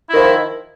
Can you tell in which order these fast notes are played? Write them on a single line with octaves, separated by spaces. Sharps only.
E4 D#3 F3